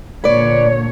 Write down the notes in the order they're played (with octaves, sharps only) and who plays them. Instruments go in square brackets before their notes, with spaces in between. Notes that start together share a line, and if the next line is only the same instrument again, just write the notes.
[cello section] A#2 D3 C#5 [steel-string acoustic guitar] B4 D5